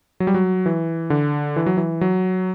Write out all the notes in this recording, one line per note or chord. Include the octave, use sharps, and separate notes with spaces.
F#3
G3
F#3
E3
D3
E3
F#3
E3
F#3